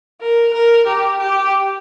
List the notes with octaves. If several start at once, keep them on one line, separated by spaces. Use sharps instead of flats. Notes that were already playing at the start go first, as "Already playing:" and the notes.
A#4
A#4
G4
G4